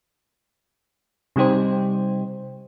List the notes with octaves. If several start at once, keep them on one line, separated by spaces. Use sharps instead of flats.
C3 G3 D#4 G4 C5